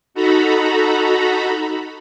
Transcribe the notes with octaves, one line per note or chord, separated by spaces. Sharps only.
D#4 F#4 A4 A#5 B5